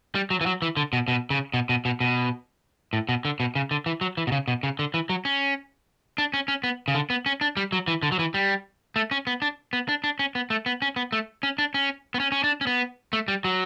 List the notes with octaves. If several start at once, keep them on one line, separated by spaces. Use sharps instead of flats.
G3
F#3
E3
F#3
E3
D3
B2
B2
C#3
B2
B2
B2
B2
A2
B2
D3
B2
C#3
D3
E3
F#3
E3
B2
C#3
B2
C#3
D3
E3
F#3
C#4
D4
C#4
C#4
B3
C#3
D3
B3
C#4
D4
G3
F#3
E3
D3
F#3
E3
G3
A3
C#4
B3
D4
B3
D4
D4
C#4
B3
A3
B3
C#4
B3
A3
C#4
D4
C#4
B3
C#4
C#4
D4
C#4
B3
A3
G3
F#3